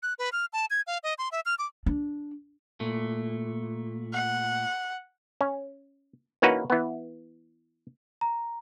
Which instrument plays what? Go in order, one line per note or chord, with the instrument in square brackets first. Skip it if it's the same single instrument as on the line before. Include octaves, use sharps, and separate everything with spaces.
[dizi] F#6
B4
F6
A5
G#6
F5
D#5
C6
E5
F6
D6
[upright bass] D4
[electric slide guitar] A#2 A3
[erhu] F#5
[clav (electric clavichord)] C#4
E3 A#3 C#4 D#4 F#4 B4
E3 B3
[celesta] A#5